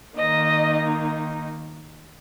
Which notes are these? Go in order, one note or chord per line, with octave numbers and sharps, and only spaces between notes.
D#3 A#3 D#4 D#5